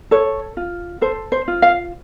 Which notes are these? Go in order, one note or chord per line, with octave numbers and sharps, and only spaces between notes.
A4 C#5
F4
A4 C5
C5
F4
F5